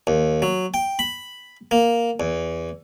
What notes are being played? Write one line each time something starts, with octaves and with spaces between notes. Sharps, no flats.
D#2
F#3
G5
B5
A#3
E2